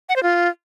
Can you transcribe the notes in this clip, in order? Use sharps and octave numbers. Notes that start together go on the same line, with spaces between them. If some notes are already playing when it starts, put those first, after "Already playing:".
F#5
C5
F4